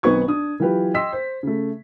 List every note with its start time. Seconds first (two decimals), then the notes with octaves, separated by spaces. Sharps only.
0.03 B1 D#3 B3 C4 C#6 G#6
0.28 D4 D#6
0.60 E3 F#3 F4 G4 B4
0.94 D#5 G5 C6 E6 B6
1.13 C5
1.43 C#3 A3